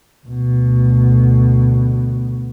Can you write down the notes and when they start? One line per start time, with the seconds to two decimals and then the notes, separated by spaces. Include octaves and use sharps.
0.27 D2 B2